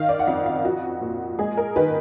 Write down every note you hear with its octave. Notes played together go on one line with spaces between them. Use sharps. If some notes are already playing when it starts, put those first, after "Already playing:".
Already playing: D#3 F5
D5
F#5
F2 F5
F5
F3 F#4
A#2
G#3 G#4
A#4
D#3 B4